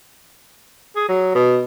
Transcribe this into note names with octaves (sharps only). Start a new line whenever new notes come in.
G#4
F#3
B2